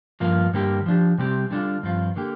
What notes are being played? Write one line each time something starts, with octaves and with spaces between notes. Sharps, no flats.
G2 F3 A#3 F4
G2 D3 G3 A#3 G4
F3 D4 G4
C3 G3 C4 G4
D3 G3 D4 F4
G2 F3 C4 F4
D3 A#3 G4